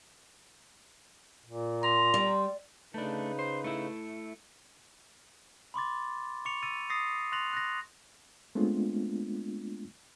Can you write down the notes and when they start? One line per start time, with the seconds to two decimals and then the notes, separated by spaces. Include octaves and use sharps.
1.46 A#2
1.83 A#5 C6
2.14 G3
2.94 C#3 A3 D4 D#4 B4
3.39 C5
3.64 A3 E4
5.74 B5 C6 D6 A6
6.45 C#6 D6 C#7 F7
6.63 E6 A6 C#7 D#7
6.90 D#6 A6 A#6 C7
7.32 C6 F#6 A6 A#6 F7 F#7
7.53 F#6 A6 A#6
8.55 G#3 A3 B3 C4 D4 F4